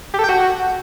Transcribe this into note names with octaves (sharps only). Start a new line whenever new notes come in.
G4
A4
G5
F#4